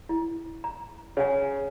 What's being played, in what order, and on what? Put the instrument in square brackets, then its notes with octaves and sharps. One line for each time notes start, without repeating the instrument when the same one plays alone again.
[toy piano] E4
A#5
[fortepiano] C#3 [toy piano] C#5 F#5 G#5